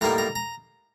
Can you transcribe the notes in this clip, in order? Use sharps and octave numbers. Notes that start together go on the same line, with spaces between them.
A2 G3 A#3 D#4 A#5
A#5
A#5